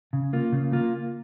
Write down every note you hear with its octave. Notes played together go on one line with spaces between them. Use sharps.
C#3
A#3 F4
C#3
A#3 F4